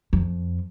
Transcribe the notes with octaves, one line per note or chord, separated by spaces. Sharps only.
F2